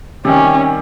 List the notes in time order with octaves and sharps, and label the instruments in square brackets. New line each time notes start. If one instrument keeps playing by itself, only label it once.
[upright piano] C3 D#3 G3 [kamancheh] C#4